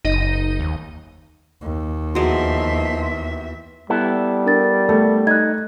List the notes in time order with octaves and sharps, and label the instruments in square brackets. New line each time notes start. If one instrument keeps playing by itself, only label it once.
[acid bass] F#1 [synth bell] D#4 D#5
[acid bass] D#2
[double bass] D#2
[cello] E2 E5 [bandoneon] F3 C6 [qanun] F#3 G#3
[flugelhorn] G3 [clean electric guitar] B3 E4 A4
[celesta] D4 A#4 A6
[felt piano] A3
[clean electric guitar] D#4 [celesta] F#6 G#6